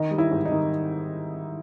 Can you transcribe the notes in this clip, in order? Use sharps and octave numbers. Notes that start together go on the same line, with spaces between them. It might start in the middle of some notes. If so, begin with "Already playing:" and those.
Already playing: D#3 D#5
G3
E4
G#2
D#4
D#3